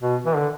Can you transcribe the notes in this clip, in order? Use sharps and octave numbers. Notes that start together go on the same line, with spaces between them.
B2
E3
D3